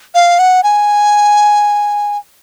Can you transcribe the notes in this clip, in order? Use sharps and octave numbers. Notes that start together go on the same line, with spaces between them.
F5
F#5
G#5